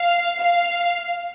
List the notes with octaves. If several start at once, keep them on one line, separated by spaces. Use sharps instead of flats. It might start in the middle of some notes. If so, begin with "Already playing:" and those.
Already playing: F5
F5